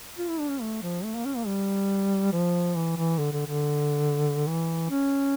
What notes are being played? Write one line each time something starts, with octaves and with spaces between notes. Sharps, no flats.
F4
E4
D4
C#4
A3
F3
A3
A#3
C#4
A#3
G3
F3
E3
E3
D3
D3
D3
E3
C#4